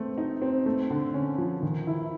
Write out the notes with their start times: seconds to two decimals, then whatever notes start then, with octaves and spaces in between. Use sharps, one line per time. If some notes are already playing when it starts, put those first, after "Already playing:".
Already playing: A3 C4
0.18 D#4
0.42 C4
0.66 A3
0.90 D3
1.14 C#4
1.38 F3
1.63 D#3
1.87 E4